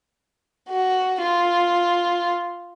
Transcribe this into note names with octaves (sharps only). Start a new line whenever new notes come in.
F#4
F4